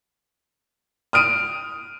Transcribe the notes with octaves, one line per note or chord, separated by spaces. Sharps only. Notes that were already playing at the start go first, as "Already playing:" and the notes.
D#6 F6 D7 D#7